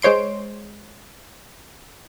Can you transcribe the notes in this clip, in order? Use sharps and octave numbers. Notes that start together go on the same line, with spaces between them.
G#3 C5 C#5 C6 D7